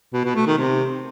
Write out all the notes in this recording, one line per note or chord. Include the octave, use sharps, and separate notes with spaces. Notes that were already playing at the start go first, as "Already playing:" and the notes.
B2
B2
A3
D#3
C3